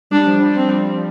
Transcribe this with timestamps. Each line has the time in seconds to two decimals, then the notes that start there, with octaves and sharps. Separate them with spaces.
0.11 G3 D4
0.26 F3
0.42 G3
0.56 C4